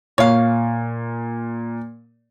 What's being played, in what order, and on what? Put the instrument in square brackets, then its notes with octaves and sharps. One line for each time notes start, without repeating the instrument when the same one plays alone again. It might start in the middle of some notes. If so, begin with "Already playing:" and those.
[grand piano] A#2 [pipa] C#5 F5